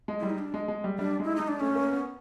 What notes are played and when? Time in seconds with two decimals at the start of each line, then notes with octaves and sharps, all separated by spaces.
0.08 G#3
0.20 G3 E4
0.30 D#4
0.38 D4
0.54 G#3
0.68 G#3
0.84 G3
0.99 G3 D4
1.20 G#3 E4
1.36 G#3 D#4
1.48 D4
1.60 A3 C#4
1.70 A3
1.75 A#3
1.91 B3